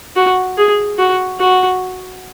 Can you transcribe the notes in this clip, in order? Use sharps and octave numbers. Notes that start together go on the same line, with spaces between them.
F#4
G#4
F#4
F#4